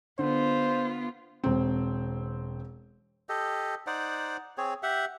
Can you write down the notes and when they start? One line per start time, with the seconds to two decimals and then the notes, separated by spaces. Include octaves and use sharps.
0.19 D3 B3 F4 C5
1.44 E1 C4
3.29 G4 A4 D#5
3.87 D#4 C5 D5 F#5
4.58 C4 G#4 C#5
4.83 G4 E5 F#5